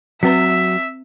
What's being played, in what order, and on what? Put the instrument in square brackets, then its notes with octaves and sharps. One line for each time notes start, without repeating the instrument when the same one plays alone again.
[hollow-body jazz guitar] F#3 F#4 [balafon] C4 B4 A#5 [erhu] E5